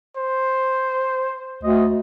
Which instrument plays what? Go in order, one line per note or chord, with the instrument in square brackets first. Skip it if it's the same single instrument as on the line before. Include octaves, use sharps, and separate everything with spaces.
[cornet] C5
[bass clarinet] D2 [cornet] D#5